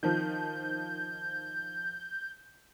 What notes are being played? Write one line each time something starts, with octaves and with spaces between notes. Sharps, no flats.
D#3 F3 G6